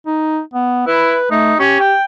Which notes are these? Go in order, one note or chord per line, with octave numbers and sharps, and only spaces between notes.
D#4
B3
E4 B4
A3 D#4
C#4 G4
G5